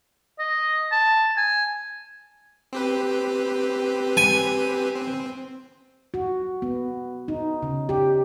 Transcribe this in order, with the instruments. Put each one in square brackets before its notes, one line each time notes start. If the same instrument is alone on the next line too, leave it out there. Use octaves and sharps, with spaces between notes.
[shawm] D#5
A5
G#5
[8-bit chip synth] C4 G4 B4
[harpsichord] G#5
[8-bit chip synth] C4
[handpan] F#4
B3
D#4
C#3
G4